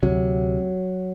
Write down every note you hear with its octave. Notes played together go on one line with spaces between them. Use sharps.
D2 C3 F#3